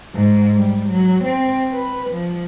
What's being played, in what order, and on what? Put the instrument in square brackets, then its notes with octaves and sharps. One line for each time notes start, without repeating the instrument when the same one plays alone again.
[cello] G#2
G3
F#3
C4
B4
F3